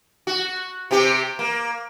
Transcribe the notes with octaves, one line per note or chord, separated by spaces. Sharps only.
F#4
C3 C4 G4
A#3